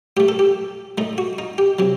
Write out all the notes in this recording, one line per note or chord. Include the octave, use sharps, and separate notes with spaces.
A2 A3 G4
A4
G4
A2 A3 D#4
F#4
D#4
G4
C3 F#3